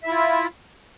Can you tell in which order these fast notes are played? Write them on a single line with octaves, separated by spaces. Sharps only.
E5 E4 F4